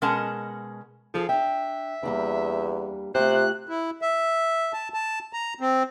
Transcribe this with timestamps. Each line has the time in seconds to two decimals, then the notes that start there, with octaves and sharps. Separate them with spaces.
0.02 B2 G#3 C#4 A#4 F#5 A5
1.14 F3 G#4 A4
1.29 D4 E5 G5
2.03 E2 G3 A#3 D4
3.15 C3 A3 F4 G4 C5 F#6
3.67 E4
4.02 E5
4.73 A5
4.94 A5
5.33 A#5
5.61 C4